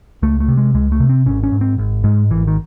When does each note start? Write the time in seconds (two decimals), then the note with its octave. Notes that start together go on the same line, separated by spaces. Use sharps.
0.23 C#2 A3
0.40 A3
0.48 C3
0.57 G#3
0.74 C#2 G#3
0.92 A3
1.00 C3
1.09 C4
1.26 G#1 C#4
1.43 C#4
1.52 G#2
1.61 C4
1.78 G#1
2.04 G#2 G#3
2.30 G#1 E3
2.48 D#3